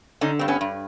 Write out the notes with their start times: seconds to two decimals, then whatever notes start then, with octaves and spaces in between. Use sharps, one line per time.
0.21 D3 C#4 D#4
0.39 G2 C4
0.48 B3 C#4
0.61 G2